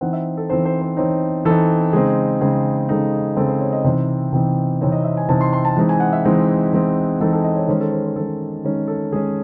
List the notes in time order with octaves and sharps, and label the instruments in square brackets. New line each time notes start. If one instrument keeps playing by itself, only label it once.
[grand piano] E3 C4 D#4 F#5
E5
A4
E3 C4 D#4 C5
C5
C5
E3 C4 D#4 C#5
E3 C4 D#4 A4
C#3 G#3 C4 D#4 G#4
C#3 G#3 C4 D#4 G#4
C#3 G#3 C4 D#4 A4
C#3 G#3 C4 D#4 A4
C5
C#5
D#5
C3 E3 C4 D#4 C5
C3 E3 C4 D#4
C3 E3 C4 D#4 C#5
D#5
E5
G#5
C3 E3 C4 D#4 A5
C6
C6
A5
E3 G#3 C4 D#4
G#5
F#5
E5
E3 G#3 C4 D#4
E3 G#3 C4 D#4
E3 G#3 C4 D#4 A4
A4
D#5
C#5
D#3 G#3 C#4 C5
A4
C5
C5
D#3 G#3 C#4 A4
D#3 G#3 C#4 G#4
A4
D#3 G#3 C#4 G#4